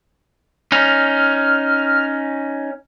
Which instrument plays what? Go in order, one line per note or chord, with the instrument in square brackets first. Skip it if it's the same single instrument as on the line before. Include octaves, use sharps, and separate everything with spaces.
[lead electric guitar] C#4 D#4 [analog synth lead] F6